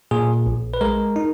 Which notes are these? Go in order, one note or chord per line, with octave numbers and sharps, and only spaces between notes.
A#2 G#4
A#1
B4
G#3 A#4
D#4